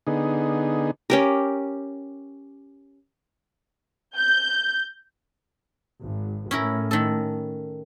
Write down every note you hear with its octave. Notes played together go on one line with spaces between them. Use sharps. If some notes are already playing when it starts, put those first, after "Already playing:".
D3 B3 D#4 G#4
C#4 G4 A#4
G6
G#1
A2 C#4 E4 A#4
D#3 A4